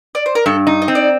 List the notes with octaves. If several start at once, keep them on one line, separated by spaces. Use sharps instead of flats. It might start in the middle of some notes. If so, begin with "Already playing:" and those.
D5
C5
A#4
G2 A4
D#4
D#5
C4
D5